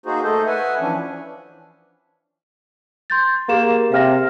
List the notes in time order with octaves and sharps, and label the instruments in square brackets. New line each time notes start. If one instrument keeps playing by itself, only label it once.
[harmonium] A#3 D#4 F#4 G#4 C5
A3 A4 C5 D#5
B4 E5 F#5 G#5
E3 F3 C#4 D4
[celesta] C6 G6 A6
[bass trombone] A#3 [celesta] G4 G#4 E7
[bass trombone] C3 [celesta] F5 F6 A#6